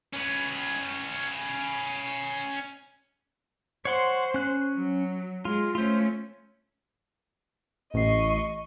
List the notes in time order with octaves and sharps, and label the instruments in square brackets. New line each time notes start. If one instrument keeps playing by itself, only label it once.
[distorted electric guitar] C#4 B4
[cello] C5 [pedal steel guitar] C#5 F#5 C6
[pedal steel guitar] C#4 F#6
[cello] F#3
[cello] G#3 [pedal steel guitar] F4
[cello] A3 C#4 [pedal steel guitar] F4 C5
[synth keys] A1 C7 [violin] D#5 C#6